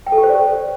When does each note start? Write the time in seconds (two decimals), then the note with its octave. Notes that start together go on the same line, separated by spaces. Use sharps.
0.07 G5
0.12 A4
0.18 G4
0.23 C5
0.29 D5